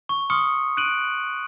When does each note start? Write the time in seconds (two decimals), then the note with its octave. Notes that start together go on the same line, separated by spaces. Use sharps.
0.09 C#6
0.30 C6 C#6 D#6 F6 C#7
0.77 F#6 D7 D#7 F#7